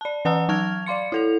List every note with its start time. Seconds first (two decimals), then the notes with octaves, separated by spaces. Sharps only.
0.01 D5 A5
0.25 E3 B4 F#5 A5 A#5 E6
0.49 F#3 A5 C#6 F6 G#6 F7
0.86 D5 F5 C6 C#7
1.12 E4 A4 F7